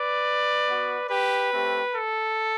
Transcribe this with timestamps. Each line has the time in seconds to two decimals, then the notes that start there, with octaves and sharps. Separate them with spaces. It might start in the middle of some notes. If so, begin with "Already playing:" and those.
Already playing: B4 D5
0.67 B3 F#4
1.10 G4 B4
1.52 A3 C4 G4
1.94 A4